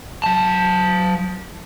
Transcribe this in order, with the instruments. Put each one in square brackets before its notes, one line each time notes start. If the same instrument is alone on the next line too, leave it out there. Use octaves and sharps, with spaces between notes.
[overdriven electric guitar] F#3 A5